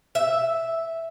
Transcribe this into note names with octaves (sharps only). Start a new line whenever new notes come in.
E5